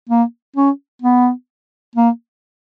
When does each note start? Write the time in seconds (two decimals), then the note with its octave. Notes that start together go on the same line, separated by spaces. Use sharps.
0.09 A#3
0.56 C#4
1.02 B3
1.95 A#3